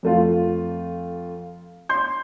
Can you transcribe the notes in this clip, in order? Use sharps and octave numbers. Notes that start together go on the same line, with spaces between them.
F2 A3 F4
C6 G6